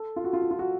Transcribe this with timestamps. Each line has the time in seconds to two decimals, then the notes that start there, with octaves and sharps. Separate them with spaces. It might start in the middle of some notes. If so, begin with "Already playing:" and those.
Already playing: A4
0.16 F4
0.24 F#4
0.33 F4
0.42 F#4
0.51 F4
0.59 F#4